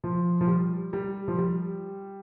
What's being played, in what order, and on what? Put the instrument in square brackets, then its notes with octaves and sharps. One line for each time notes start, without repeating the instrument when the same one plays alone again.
[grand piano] F3
F3
G3
G3
F3
G3